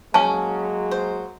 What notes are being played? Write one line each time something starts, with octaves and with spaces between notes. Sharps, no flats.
F#3 G#3 A#3 C#4 A5 C#6
C5